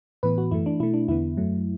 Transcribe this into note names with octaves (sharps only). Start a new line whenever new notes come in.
A2 E3 B3 B4
F#4
F#2 E3 A3 E4
D4
B2 A3 E4
D4
E2 D3 B3 E4
F#2 F#3 A3